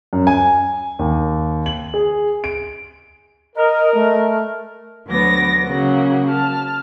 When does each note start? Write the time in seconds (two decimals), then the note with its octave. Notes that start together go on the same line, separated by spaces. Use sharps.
0.13 F#2
0.27 G#5
0.99 D#2
1.66 F#7
1.94 G#4
2.44 D7
3.56 A#4 D#5
3.94 A3
5.07 D2 F#3 B3 D6 A#6
5.63 C#3 F#3 A#3 F#5
6.28 A5 F6